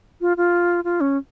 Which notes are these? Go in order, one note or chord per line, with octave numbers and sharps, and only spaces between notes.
F4
F4
F4
C#4